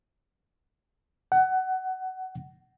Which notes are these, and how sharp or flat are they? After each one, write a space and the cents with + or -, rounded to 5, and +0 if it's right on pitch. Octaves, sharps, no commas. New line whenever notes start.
F#5 +20